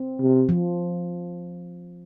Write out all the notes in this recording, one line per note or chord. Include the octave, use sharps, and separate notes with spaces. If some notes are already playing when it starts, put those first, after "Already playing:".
Already playing: C4
C3
F3